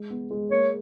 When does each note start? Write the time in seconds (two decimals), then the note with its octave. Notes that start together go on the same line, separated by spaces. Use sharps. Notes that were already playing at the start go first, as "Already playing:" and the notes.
Already playing: G#3
0.10 B3
0.31 G#3
0.51 A#3 C#5